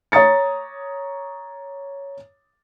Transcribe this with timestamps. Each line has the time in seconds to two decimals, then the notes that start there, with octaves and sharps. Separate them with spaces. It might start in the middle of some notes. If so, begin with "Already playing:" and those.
0.12 C#5 A#5 D#6 A6 C#7